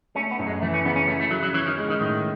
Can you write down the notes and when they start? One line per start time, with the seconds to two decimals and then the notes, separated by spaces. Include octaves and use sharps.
0.16 A3 C#4
0.31 B3
0.39 F#2
0.46 G#3
0.62 E3 A3
0.74 C#4
0.85 C#3 B3
0.96 C#4
1.08 A3 E4
1.20 A3
1.31 C#3 F#3
1.43 F#3
1.54 E3 C#4
1.66 D#3
1.78 G#3
1.89 D#3
2.00 A2 D#3